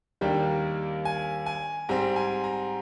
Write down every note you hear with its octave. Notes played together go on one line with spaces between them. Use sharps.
D#2 D#3 G3 A#3 D4 G5
G#5
G#5
G#2 G3 C4 A#5
G#5
A#5